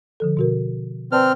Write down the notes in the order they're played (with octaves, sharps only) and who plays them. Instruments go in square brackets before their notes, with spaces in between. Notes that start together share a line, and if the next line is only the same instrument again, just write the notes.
[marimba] D3 F3 A4
B2 F#4 A#4
[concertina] C4 F6 [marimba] B4 D5 A5